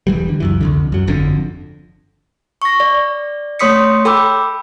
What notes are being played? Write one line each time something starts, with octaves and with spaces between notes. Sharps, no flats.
E1 E3 G3
D3
C#2 F#2 E3
C2 F2 D3
F#2 F#3
G1 F2 D3
C#6 A#6
D5
A3 C#5 C6 D#6 B6 C#7
A4 G5 B5 D6 E6